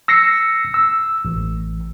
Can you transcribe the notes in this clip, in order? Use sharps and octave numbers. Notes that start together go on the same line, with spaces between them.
E6 A#6 C7 C#7
E6
A1